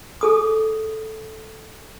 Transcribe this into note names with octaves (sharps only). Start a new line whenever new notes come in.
G#4 A4 D#6